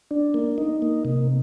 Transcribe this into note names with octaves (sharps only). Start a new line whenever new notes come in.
D4
A#3
D#4
A#3
C3